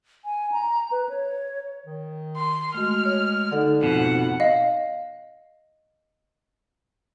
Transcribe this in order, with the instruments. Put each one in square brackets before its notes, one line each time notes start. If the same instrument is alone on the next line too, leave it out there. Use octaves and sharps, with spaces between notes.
[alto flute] G#5
A#5
B4
C#5
[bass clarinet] D#3
[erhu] C6
[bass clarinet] G#3 [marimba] A3 F#4 [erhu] F6
[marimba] C#5
[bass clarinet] D3 [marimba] D#4 A4 D5
[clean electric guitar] F2 B2 [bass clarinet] G#2 [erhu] F#5
[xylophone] D#5 F5